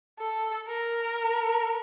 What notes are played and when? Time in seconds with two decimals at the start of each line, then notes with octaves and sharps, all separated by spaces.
0.19 A4
0.68 A#4